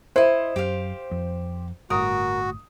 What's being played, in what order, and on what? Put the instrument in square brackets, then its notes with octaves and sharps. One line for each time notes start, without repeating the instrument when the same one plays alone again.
[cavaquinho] E4 D#5 [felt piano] C5
[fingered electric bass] F#2 [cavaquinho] G4 F5
[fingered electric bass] F2
[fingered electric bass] G1 A2 [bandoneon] F#4 [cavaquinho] A#4 [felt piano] D#6